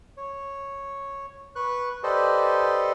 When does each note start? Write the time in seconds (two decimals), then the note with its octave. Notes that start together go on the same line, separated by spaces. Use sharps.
0.17 C#5
1.56 B4 C#6 F#6
2.03 G4 A4 B4 C5 D5 D#5